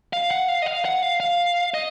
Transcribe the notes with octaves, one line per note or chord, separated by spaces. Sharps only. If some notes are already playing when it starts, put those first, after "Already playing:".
F5
F#5
F5
D#5
F5
F#5
F5
F5
D#5